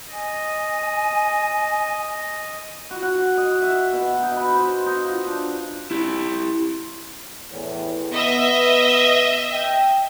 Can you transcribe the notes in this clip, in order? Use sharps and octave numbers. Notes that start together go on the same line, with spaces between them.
D#5 G#5
F#4
F#5
D#5
E5
B2
D#4
B4
C5
D#4
F4
D4
E4 G4
E2 A2
B3 D#5 E5
G5